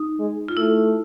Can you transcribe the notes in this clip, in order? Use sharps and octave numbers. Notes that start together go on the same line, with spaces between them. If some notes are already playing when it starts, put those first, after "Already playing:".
Already playing: D#4
G#3
F4
A3 E4